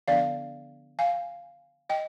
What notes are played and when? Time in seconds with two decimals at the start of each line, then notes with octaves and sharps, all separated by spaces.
0.08 D3 F3 B3 D4 D5 F5
0.99 F5 G#5
1.89 D#5 G5